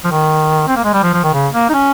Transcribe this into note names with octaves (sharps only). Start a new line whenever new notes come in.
F3
D#3
C4
A#3
G#3
G3
F3
F3
D#3
C#3
A#3
D#4
C#4